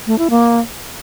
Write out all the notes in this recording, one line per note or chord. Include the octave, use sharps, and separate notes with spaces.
A3
E4
A#3